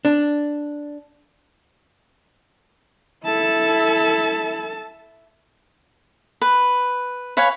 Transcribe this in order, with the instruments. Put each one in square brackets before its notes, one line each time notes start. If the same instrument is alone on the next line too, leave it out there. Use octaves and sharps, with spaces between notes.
[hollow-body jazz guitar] D4
[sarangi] E4 [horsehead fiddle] A4 A5
[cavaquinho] B4
B4 C#5 F5 G#5